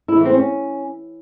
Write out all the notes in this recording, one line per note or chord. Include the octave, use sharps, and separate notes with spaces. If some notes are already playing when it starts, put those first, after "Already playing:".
E4
E3
C4
C#4